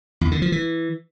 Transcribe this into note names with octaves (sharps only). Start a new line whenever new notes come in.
E2
D3
F3
E3